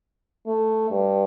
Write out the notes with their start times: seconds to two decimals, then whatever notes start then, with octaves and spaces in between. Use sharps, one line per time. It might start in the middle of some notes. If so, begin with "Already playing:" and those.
0.46 A3
0.90 G2